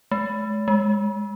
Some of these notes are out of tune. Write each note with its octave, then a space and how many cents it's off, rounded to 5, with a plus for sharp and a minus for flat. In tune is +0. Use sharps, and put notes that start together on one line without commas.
G#3 +40
G#3 -10